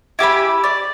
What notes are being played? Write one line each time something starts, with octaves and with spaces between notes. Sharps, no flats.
E4 G4 G#5 B5
D5